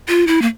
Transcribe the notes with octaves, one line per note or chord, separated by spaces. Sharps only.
F4
E4
A#3